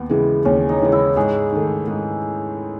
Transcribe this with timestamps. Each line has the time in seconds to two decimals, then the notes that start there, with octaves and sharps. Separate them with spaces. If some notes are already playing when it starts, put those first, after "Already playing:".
Already playing: D#2 B3
0.09 C#3 E3 G#3
0.45 D#2 C#4
0.69 D#4
0.81 C#3 E3 G#3
0.92 E4
1.16 G#2 G#4
1.52 D#3 A3
1.88 G#2